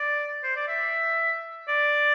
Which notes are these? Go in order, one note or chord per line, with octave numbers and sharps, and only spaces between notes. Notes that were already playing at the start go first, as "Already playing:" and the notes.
Already playing: D5
C5
D5
E5
D5